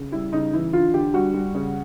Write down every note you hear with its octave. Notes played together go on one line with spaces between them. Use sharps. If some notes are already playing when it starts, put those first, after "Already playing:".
Already playing: C#3
G3 E4
C#3 D#4
E3 E4
D3 F4
D3 G4
G3 F#4
G3
C#3